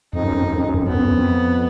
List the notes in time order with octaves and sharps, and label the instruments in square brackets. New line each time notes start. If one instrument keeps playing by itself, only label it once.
[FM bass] F2 [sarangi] D#4
[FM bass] F#2
F2
F#2
F2
F#2
F2
[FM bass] F#2 [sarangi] B3
[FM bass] F2
F#2
F2